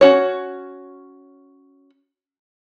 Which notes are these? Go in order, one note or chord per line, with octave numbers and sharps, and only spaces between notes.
C#4 F#4 C#5